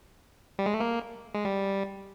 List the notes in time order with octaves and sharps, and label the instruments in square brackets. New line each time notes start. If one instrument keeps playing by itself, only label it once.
[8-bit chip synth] G3
G#3
A3
A#3
G#3
G3